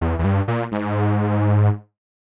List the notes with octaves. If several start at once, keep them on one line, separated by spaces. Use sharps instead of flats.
E2
E2
G2
A#2
G#2